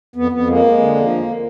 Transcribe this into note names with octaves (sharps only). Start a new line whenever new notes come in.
F2 B3
F2 B3
G#3 A#3
G#3
D3
F3
E2